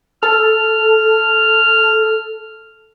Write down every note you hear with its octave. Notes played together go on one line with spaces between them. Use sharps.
A4 F6